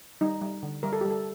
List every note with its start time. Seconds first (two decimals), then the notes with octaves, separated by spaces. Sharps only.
0.21 G3 D#4
0.42 G3
0.63 D3
0.83 G3 A#4
0.93 A4
1.01 G3 G4
1.10 A4